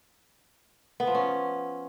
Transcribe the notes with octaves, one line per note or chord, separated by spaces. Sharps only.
B3
F3
C#4